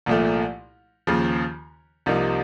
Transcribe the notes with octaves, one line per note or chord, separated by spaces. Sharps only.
C2 A#2 F3 A3
D#2 C#3 F3
C2 C3 F3 A#3 D#4